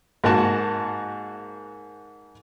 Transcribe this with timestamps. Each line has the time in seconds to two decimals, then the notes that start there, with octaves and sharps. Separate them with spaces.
0.24 G#2 A#3 F#4 A5